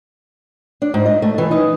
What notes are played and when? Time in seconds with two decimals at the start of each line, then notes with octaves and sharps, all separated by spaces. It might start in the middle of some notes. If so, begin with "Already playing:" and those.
0.82 D4
0.94 G#2
1.06 D#5
1.22 A3
1.38 E3
1.51 D#4